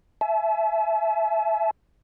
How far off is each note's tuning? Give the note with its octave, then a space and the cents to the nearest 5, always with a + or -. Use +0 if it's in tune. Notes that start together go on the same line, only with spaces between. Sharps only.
E5 +10 A5 -45